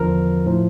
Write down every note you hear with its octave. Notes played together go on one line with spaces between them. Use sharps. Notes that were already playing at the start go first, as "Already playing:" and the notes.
Already playing: E2 D3 F3 A#4
A2 F3